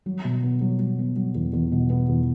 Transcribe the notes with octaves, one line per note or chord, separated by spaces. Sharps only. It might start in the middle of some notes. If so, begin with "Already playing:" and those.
F#3
B2
B3
F#3
F#3
B3
F#3
E2
E2
B2
B3
E2